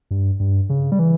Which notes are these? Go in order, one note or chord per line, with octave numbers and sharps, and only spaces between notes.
G2
G2
C#3
G3
E3